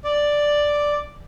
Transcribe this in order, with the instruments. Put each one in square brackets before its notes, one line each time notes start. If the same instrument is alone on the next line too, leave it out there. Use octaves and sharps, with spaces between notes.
[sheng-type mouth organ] D5